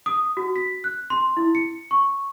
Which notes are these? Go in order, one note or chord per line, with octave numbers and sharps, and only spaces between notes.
D#6
F#4
B6
F#6
C6
E4
C#7
C#6